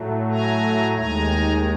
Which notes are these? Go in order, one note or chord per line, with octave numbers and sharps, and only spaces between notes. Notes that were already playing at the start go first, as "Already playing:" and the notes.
Already playing: A2 F#3 A3
G#5 A#5
D#2 D#3 G#3 G#5 A#5